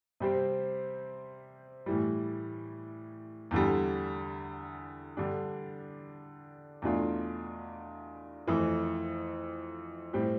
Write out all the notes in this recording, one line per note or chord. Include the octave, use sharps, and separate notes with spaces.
C3 G3 C4 G4 C5
A2 E3 G3
E2 D3 G3
D3 G3 D4
E2 B2 A3 D4 F4
F2 E3 A3
A2 G3 C4 G4